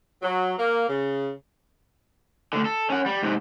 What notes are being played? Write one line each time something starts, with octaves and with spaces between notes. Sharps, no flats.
F#3
A#3
C#3
D2 D3
A4
C#4 F#5
G3
G#2 C3